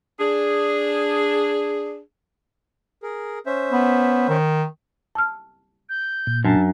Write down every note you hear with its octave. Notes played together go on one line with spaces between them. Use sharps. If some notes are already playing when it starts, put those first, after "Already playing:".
D4 G#4
G#4 A#4
C#4 C5 E5
B3
D#3
A5 E6 F6
G6
A#2
F#2 D4 A5